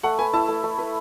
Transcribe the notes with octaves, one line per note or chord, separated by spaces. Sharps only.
A3 F#5
B4 G#5
E4 A5
A3
A3
B4